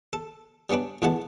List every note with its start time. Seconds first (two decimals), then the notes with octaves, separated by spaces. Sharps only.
0.13 A4
0.70 G3 B3 C#4 D4 B4
1.02 A2 E3 G#3 B3 F#5 A5